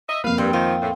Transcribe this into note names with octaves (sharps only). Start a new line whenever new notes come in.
D#5 E5
F2 A#3 B4 F5
G2 C4
D#3 F3 F4
A2